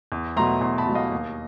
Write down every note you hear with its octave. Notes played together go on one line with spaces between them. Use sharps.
E2
B2 F#3 A3 A#5 C6
E2 A#5 C6
A5 B5
B2 F#3 A3
D#5 F5
D#2